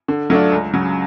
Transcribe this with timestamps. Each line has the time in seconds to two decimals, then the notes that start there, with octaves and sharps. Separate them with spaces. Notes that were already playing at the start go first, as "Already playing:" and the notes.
0.08 D3
0.30 F#3 A3 D4 F4
0.52 C#2
0.74 C#3 F#3